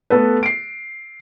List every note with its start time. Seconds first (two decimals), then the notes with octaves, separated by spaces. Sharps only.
0.10 A3 B3 A4 B4
0.43 C7 D7